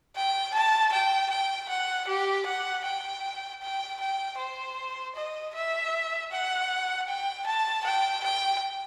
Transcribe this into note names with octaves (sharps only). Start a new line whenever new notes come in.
G5
A5
G5
G5
F#5
G4
F#5
G5
G5
G5
C5
D#5
E5
F#5
G5
A5
G5
G5